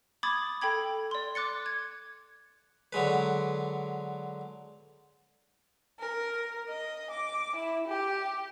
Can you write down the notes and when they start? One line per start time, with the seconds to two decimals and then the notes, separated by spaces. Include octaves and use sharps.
0.23 B5 D6 D#6 G#6 A6
0.61 A4 G5 B5 G#6
1.11 D5 C6
1.35 D6 F#6 A6 C#7
1.66 G#6
2.93 D3 F#3 G#3 B4
5.99 A#4
6.68 D#5
7.10 D6
7.55 E4
7.87 G4